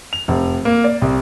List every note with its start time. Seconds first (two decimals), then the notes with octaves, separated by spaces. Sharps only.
0.13 F7
0.28 F1
0.65 A#3
0.84 D5
1.02 C2